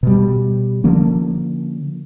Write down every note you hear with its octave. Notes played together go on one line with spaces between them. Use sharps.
B2 G3
D3 F3 A#3 C#4